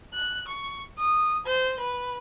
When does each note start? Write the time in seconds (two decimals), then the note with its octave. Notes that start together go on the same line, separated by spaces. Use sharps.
0.14 F#6
0.47 C#6
0.98 D#6
1.45 C5
1.79 B4